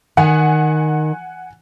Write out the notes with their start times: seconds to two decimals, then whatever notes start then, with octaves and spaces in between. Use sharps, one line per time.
0.17 D#3 F#5 G#5